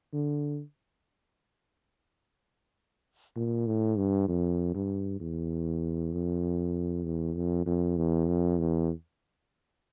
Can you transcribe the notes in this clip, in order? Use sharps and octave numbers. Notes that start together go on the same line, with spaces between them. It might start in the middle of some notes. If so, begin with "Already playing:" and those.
D3
A#2
A2
G2
F2
G2
E2
F2
E2
F2
F2
E2
F2
E2